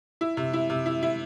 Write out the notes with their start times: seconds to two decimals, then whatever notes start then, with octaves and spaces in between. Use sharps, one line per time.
0.21 E4
0.37 C3
0.53 E4
0.70 C3
0.86 E4
1.03 E4